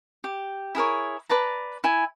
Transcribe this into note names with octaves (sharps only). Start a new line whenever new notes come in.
G4
E4 G#4 A#4 C#5
B4 D5 A5 A#5
E4 G#5